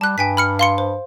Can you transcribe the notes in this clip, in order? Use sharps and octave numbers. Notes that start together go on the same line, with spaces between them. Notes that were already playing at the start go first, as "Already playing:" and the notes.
G3 A5 F#6
G2 G5 G#5 B6
B5 F6 C#7
F5 C6 C#7
C5